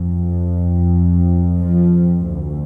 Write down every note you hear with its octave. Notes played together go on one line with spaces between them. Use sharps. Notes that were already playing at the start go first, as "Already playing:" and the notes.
Already playing: F2
F3
D2